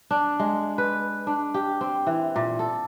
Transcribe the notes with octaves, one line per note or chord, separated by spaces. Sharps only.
D4
G#3
B4
D4
G4
C4
E3
A#2
A4